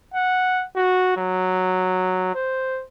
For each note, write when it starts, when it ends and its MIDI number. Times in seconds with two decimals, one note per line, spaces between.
0.14 0.66 78
0.76 1.15 66
1.17 2.32 54
2.35 2.82 72